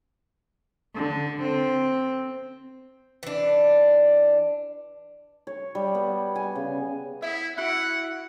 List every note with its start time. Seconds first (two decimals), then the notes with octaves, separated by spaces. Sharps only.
0.95 D3
1.42 C4
3.23 E3 D4
5.47 C#5
5.75 G3
5.95 B3
6.36 G#5
6.55 C#3
7.22 B3 E4 E5
7.58 E4 F#4 F#5 F#6